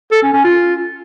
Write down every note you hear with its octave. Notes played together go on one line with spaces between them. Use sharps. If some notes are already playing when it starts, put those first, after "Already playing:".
A4
C#4
C#4
F4